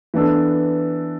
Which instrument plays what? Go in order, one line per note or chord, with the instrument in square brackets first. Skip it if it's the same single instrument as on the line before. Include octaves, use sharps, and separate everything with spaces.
[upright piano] E3 B3 D4 A4